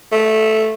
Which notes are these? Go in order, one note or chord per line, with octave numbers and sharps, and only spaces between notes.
A3